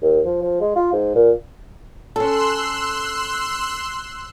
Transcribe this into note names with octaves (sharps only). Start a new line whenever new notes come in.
D#2
F3
F3
G#3
F4
G#2
A#2
C#4 A4 C6 E6 F#6